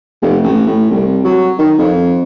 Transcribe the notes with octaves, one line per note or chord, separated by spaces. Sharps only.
F1
A1
A2
C2
F#3
D#3
F2